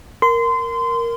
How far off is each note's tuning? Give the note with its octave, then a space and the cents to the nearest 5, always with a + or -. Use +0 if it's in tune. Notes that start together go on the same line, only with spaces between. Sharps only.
A#4 +0 C6 -25